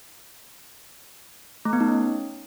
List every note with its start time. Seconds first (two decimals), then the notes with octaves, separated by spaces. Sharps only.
1.65 A3
1.73 B3
1.80 D#4
1.88 C#4